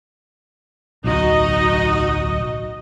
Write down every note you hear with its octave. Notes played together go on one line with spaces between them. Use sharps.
D1 B1 D#4 F#4 D#5